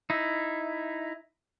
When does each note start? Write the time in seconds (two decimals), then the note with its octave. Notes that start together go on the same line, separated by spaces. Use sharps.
0.10 D#4 E4